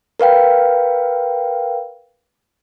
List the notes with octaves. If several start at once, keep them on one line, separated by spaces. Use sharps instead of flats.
A#4 B4 F5 G5